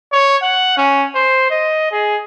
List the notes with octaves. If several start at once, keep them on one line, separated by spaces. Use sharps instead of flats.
C#5
F#5
C#4
C5
D#5
G#4